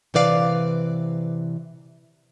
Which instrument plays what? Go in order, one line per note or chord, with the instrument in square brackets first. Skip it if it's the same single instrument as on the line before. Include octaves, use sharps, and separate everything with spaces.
[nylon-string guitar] C3 E3 B4 D5 F5